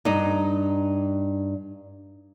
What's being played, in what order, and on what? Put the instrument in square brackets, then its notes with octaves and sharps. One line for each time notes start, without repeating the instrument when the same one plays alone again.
[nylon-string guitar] G2 D#4